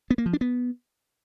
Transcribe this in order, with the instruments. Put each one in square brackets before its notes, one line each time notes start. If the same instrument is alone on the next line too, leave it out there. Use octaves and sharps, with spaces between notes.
[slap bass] B3
A#3
F3
D4
B3